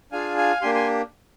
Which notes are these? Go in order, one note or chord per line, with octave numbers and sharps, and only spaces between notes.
D4 F4 G#4 F5 G#5
F5 G#5
A#3 D4 G4 G#5 C6
G#5 C6